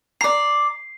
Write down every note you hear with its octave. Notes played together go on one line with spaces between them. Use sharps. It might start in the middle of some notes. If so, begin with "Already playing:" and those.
D5 A#5 C7